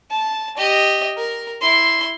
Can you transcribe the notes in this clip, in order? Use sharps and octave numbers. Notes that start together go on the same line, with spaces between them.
A5
G4 D#5
A#4
E4 C6